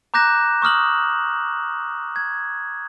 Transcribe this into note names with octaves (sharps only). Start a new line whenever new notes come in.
A#5 D6 F#6 G6 A#6 E7
C#6 D#6 F6 F#7
G#6